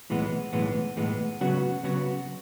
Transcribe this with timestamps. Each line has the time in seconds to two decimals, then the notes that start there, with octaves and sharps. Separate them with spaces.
0.10 B1 A2 E3 G#3 B3
0.53 B1 A2 E3 G#3 B3
0.97 B1 A2 E3 G#3 B3
1.41 C#3 F#3 B3 F#4
1.83 C#3 F#3 B3 F#4